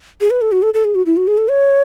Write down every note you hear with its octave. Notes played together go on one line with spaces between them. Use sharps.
G#4
B4
A4
F#4
A4
A4
G#4
F#4
E4
F#4
G#4
A4
C#5